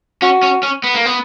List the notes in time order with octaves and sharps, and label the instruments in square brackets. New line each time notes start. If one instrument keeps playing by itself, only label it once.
[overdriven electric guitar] C#4 [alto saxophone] F#4
[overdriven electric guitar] C#4
C#4
B3
A#3
B3